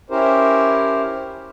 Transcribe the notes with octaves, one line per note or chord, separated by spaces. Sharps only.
C#4 E4 G4 A#4 C5